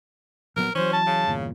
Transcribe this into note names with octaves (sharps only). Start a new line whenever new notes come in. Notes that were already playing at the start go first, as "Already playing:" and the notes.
A#1 F#3 B3 A#4
E3 F#3 C#4 C5
A5
C#3
G1 E2 A#2